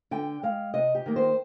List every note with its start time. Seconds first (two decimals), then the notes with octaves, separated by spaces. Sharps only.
0.11 D3 G5
0.43 G#3 F5
0.74 C3 D#5
0.95 G4
1.06 D#3 A#3
1.16 C5